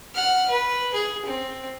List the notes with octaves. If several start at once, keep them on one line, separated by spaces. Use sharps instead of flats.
F#5 F6
B4
G#4
C4